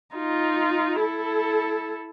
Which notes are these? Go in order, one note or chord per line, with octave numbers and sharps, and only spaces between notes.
D#4 F4
E4 A4